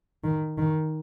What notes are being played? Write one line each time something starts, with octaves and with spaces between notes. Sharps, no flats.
D#3
D#3